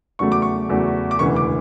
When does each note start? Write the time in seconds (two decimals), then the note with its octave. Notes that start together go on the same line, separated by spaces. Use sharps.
0.19 E2 C#3 F#3 A3 C#6
0.32 D6
0.42 C#6
0.69 E2 C#3 F#3 A3
1.11 D6
1.19 E1 D2 C#3 E3 C#6
1.36 D6